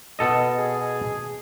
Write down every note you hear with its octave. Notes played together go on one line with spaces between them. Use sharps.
B2 A4 D#5
G#4